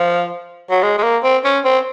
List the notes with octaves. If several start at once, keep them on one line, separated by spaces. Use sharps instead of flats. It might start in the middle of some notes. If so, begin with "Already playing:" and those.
Already playing: F3
F#3
G#3
G#3
A#3
C4
C#4
C4